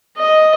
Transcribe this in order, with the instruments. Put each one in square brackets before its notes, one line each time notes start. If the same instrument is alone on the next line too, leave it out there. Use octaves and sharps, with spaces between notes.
[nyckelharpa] D#5